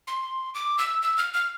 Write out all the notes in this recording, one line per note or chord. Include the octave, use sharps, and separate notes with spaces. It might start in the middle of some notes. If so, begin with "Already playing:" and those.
C6
D6
E6
E6
F6
F6